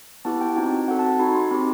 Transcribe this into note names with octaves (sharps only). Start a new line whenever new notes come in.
B3 E4 G4 A5
G5
C4 D#4 F#4 G5
C4 F#4 A4 F#5
A5
D#4 F#4 A4 B5
C6
C4 D#4 G4 B5